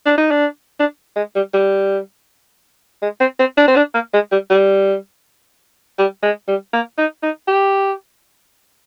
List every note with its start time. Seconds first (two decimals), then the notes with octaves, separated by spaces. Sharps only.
0.06 D4
0.18 D#4
0.31 D4
0.80 D4
1.16 G#3
1.36 G3
1.54 G3
3.02 G#3
3.20 C4
3.39 C4
3.57 D4
3.67 C4
3.76 D4
3.94 A#3
4.14 G#3
4.32 G3
4.50 G3
5.98 G3
6.23 G#3
6.48 G3
6.73 A#3
6.98 D#4
7.23 D#4
7.48 G4